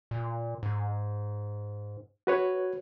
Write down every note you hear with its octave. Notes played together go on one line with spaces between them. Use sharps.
A#2
G#2
F#4 B4 C#5